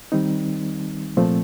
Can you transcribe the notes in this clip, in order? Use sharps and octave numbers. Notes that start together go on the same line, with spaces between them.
D#3 G3 C4 D#4
C2 A#2 F3 A3 C4